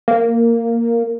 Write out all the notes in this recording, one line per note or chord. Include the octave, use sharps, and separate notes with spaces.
A#3